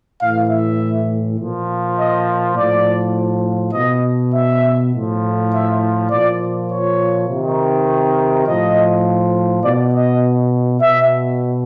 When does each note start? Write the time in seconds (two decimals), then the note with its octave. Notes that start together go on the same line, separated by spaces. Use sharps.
0.20 A2 E3 F5
0.50 E5
1.38 A#2 F3
1.98 D#5
2.56 A2 F3 D5
3.74 B2 D#5
4.33 E5
4.92 A2 F3
5.51 E5
6.10 A#2 F3 D5
6.69 C#5
7.28 C3 D#3
8.45 A2 F3 D#5
9.63 B2 D5
9.93 D#5
10.81 B2 E5